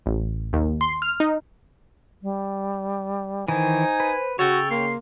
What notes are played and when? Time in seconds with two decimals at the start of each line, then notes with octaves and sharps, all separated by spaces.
0.06 A1
0.53 D#2
0.81 C6
1.02 F6
1.20 D#4
2.23 G3
3.48 D#3 E3 D#4 C5 G#5
4.00 B4
4.39 C#3 F#4 A4 C#5 G5
4.71 A#3 C6